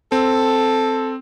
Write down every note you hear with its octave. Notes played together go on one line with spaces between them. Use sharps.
C4 A4